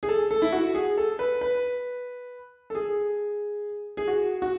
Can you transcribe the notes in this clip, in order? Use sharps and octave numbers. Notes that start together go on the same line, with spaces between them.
G#4
A4
A4
E4
F#4
G#4
A4
B4
B4
A4
G#4
G#4
F#4
F#4